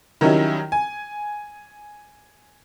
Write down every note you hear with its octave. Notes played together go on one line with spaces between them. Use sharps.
D#3 F#3 G3 C#4 D#4 E4
G#5